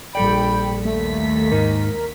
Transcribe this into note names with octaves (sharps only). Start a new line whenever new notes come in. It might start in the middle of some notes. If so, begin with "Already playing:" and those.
A#1 G3 A4 D5 G5 B5
D#2 A3 B6
G#2 D#4 A#4